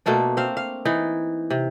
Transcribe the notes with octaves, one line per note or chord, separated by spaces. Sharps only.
B2 A3 A#3 D4
C4 F5
F5
E3 D#4
C3